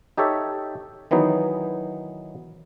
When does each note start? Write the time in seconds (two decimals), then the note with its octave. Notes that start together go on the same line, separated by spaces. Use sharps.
0.17 D#4 G4 A4 C#5 E5
1.11 D#3 E3 F#3 B3 D#4